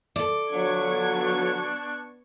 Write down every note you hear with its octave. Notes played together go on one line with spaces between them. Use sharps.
A4 D5
D3 F3 F#3 B3 D4 C#6 G#6